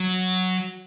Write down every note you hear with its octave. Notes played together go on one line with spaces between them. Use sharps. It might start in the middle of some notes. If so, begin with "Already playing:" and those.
Already playing: F#3